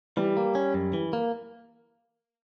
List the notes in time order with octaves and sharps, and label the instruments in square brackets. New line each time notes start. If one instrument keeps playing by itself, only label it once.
[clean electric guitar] E3 [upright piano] G3
[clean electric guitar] A#3
C#4
F#2
E3
A#3